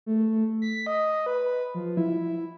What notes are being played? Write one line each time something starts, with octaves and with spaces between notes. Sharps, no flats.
A3
B6
D#5
B4
F3
E4